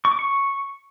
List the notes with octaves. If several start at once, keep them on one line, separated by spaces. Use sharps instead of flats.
C#6
D6
C#6